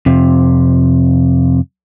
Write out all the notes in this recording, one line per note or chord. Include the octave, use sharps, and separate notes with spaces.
F2 C3